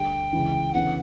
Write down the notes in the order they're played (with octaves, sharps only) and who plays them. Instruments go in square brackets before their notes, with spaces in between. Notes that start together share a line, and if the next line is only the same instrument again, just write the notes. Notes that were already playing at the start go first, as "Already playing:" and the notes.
Already playing: [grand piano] D2 D3 G3 [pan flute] G5
[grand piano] C#2 C#3 E3
[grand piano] D2 C#3 E3 B3 [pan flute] F#5